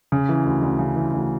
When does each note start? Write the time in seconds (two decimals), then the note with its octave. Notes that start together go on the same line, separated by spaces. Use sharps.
0.12 C#3
0.29 E3
0.46 D2
0.62 D2
0.79 C#3
0.96 E3
1.13 D2